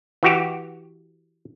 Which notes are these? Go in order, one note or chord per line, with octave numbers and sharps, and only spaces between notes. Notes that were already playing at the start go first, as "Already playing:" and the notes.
E3 F#4 G4